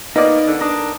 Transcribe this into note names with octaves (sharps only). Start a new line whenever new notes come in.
A#3 B3 D#4 D5 D#5
D3
D4 A#4 D#6